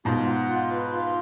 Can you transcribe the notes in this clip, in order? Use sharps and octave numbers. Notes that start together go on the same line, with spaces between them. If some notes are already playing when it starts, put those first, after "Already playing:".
G#2 B2 F4
F#5
F4
B4
F4